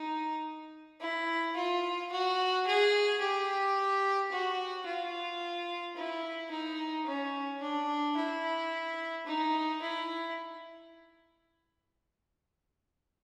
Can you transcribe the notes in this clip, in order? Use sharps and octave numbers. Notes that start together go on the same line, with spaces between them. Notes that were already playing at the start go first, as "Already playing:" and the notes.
Already playing: D#4
E4
F4
F#4
G#4
G4
F#4
F4
E4
D#4
C#4
D4
E4
D#4
E4